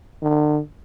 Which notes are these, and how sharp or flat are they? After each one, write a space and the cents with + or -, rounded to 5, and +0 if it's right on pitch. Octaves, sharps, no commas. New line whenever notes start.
D3 +35